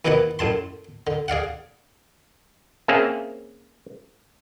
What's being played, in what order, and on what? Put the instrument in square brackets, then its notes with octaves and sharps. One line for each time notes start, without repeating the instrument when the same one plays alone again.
[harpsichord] D#2 B2 D#3 E3 B3 F#5
F#2 A2 A5 C6
D3
G#4 D5 F5 F#5
[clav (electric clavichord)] A#3 C4 C#4 G#4 E5 F5